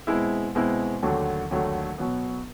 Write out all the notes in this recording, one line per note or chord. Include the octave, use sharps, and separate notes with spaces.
B2 G#3 C4 E4
B2 G#3 C4 E4
D#2 D3 F#3 A3
D#2 D3 F#3 A3
B2 F#3 B3